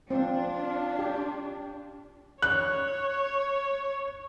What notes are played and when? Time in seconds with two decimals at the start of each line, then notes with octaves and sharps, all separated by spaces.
0.11 C4 D4 F4
0.99 G4
2.42 C#5 F#6